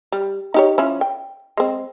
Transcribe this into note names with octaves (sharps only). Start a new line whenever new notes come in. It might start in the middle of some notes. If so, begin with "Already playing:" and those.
G3
D#4 G4 C#5
F3 C#4 E4
G5
G#3 C4